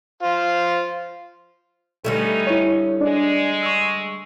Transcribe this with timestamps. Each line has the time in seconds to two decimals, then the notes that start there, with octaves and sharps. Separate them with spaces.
0.23 F4 C5
2.04 D3 G3 A3 B3 C#4 D#4
2.47 E4 C#5
3.01 G#3 D4 D5
3.63 C#6 E6